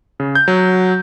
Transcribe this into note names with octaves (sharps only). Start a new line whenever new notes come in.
C#3
G6
F#3